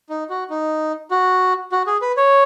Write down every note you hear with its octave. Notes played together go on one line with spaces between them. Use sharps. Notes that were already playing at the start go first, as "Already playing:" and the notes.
D#4
F#4
D#4
F#4
F#4
G#4
B4
C#5